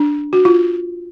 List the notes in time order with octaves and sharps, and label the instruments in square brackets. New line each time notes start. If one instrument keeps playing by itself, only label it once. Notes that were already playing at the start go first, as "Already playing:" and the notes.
Already playing: [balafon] D4
F#4
F4